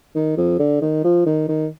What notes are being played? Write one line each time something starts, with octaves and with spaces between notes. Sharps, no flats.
D#3
F2
D3
D#3
F3
D#3
D#3